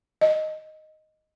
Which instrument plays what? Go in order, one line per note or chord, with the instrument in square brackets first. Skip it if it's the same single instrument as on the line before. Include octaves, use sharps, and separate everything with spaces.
[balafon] D#5